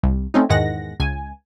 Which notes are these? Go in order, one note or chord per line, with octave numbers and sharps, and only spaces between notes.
C2
A3 C4 C#4 D#4
E2 G#2 D#3 G#3 F#5 A#6
C#2 G#5